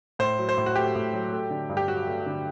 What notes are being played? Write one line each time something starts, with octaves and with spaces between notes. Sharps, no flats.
A2 C5
F#3
C5
A2
F#4
A3 G4
A2
F#3
A3
D3
G2
G4
F#3 F#4
A3
D3